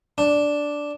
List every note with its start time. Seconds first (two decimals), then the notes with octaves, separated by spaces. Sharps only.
0.18 D4